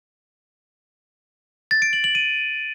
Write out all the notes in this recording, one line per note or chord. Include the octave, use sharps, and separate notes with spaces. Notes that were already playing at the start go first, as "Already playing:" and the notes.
A6
D7
F#7
F#7
D#7